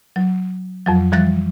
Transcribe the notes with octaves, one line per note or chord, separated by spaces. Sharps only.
F#3
F2 F3 F#3
E3 F3 G3 F#6 A6